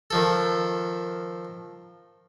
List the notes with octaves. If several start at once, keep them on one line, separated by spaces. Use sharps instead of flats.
D#3 F3 A4